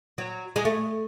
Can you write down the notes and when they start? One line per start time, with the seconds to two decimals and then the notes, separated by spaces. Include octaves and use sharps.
0.18 F#3
0.56 G#3
0.65 A3